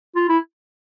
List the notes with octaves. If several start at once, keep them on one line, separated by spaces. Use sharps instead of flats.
F4
E4